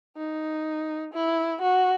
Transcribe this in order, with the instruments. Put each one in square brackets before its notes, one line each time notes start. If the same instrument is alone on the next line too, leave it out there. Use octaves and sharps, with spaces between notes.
[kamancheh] D#4
E4
F#4